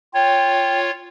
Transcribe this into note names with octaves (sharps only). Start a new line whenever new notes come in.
F4 C#5 G5